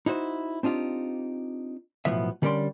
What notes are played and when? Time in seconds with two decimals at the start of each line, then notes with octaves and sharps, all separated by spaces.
0.06 D#4 E4 F#4 C5
0.63 C4 D4 D#4 F4 G4
2.05 B1 A2 D#3 F3 B3 E5
2.42 D3 G3 C#4 A#4 D5 C6